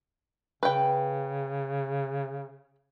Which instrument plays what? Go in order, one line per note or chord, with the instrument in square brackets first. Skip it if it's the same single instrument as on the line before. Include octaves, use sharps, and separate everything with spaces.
[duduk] C#3 [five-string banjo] B4 G5